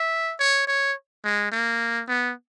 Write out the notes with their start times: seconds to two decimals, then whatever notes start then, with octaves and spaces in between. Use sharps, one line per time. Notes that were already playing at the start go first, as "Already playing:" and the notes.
Already playing: E5
0.39 C#5
0.67 C#5
1.24 G#3
1.52 A#3
2.08 B3